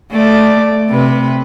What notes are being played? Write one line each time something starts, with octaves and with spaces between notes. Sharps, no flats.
A3 D5
C3 B4